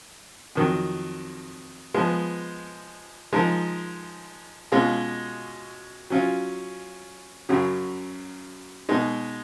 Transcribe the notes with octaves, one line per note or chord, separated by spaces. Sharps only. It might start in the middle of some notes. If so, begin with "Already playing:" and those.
F2 D#3 F#3
F3 G#3 B3
F3 G#3 D#4 A#4
B2 G#3 C#4 F4
F#3 C#4 F4
F#2 C#3 F#3
B2 G#3 D#4